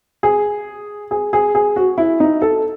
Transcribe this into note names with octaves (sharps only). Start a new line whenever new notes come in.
G#4
G#4
G#4
G#4
F#4
E4
D#4
A4